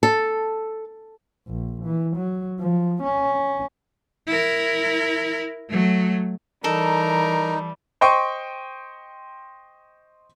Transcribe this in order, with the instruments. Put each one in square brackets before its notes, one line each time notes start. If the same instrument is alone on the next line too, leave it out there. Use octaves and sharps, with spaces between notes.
[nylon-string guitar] A4
[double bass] A#1
E3
F#3
F3
C#4
[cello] E4 A#4
F#3 A3
[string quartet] E3 G3 [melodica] D#4 [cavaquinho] A4 [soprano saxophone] A#4
[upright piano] C5 D#5 G5 C6 C#6